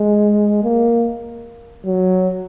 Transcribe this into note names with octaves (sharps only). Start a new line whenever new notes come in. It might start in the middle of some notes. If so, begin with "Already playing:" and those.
Already playing: G#3
A#3
F#3